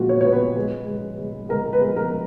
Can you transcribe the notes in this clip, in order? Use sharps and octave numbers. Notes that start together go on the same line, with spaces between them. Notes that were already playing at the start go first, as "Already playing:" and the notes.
Already playing: A#2 G#3 F4 F#4
C#5
B3 C#5
B4
G#3
G#3
G#3
G#3 A#4
B4
G#3
A#4